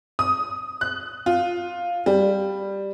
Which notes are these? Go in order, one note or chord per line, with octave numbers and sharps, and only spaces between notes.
D#6
F#6
F4
G3